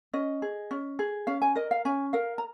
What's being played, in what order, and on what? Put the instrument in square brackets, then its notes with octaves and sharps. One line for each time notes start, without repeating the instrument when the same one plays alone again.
[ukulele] C#4 D#5
G#4
C#4
G#4
C#4 F5
G#5
A#4 D#5
F5
C#4 G#5
A#4 F5
A#5